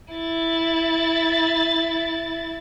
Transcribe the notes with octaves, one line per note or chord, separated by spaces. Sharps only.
E4 A6